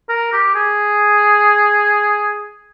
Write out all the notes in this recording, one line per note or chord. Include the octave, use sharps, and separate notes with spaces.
A#4
G4
G#4